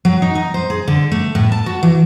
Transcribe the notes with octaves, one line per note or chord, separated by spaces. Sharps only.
F#3
D#4
D#4
C5
G#4
D3
A3
A2
A5
F#4
E3